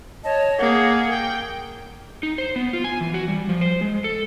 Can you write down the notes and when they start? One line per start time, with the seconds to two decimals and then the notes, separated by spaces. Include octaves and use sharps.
0.24 C#5 D#5 A5
0.58 A#3 G#4 F#5
1.12 G5
2.23 D#4
2.38 C5
2.56 B3
2.73 F4
2.84 G#5
3.01 E3
3.14 F#4
3.28 G3
3.49 F3
3.61 C5
3.81 G#3
4.04 A4